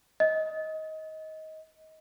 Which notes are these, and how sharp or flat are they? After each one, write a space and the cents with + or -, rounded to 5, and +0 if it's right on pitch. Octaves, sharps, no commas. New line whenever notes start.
D#5 +20